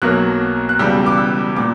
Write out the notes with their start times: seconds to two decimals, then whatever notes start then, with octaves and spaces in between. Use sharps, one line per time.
0.02 B1 B2 F#3 A#3 F#6
0.69 F#6
0.79 E1 E2 C#3 G3 E6
1.06 D6
1.17 E6
1.56 A#2 D6